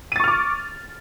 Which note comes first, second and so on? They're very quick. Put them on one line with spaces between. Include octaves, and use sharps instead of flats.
D#7 A6 C#6 F6 D6